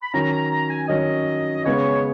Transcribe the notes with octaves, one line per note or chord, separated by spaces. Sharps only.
B5
D#3 F#3 C#4 A#5
A#5
A#5
G#5
D#3 F#3 C#4 D#5
C#3 G#3 B3 C#5